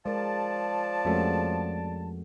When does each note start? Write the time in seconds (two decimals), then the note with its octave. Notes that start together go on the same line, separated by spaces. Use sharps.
0.06 F3 G#3 A#4 D5 A5
1.05 F2 G#3 A3 C#4 F#4 A#4